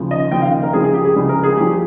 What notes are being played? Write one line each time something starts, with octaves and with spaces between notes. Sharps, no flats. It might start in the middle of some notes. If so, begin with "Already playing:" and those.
Already playing: D#2 C#3 F3
D#5
D#2 C#3 F3 G5
F5
A#4
C#2 C#3 F3 G#4
G#4
G4
G#4
C#2 C#3 F3
A#4
G#4
G2 F3 G4